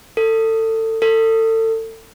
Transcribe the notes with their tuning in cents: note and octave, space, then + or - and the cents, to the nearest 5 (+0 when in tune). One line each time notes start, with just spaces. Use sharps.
A4 +25
A4 +30